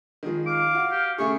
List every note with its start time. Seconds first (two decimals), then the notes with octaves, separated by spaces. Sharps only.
0.23 D#3 F3 G#3
0.46 F5 D6
0.74 F#4
0.91 G4
1.18 C#3 A3 G#4 C#6